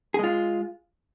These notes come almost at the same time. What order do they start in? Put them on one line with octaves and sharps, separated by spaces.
G#4 G#3 F4